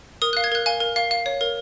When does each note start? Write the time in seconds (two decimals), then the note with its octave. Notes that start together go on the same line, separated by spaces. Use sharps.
0.22 A#4 D#6
0.33 F#6
0.37 F5
0.44 G#6
0.52 A#4 F#6
0.66 F5 G#5
0.80 A#4
0.96 F5
1.11 F5
1.26 C#5
1.41 A#4